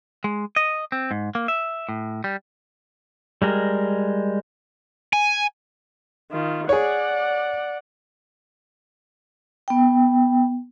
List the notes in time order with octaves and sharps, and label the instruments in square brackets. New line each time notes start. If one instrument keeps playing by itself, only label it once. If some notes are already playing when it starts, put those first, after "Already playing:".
[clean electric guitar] G#3
D#5
C4
G#2
A#3
E5
A2
G3
[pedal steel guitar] G3 G#3 A#4
[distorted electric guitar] G#5
[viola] D#3 F4
[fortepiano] G#4 C#5 [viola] D5 F#5
[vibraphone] B3 G5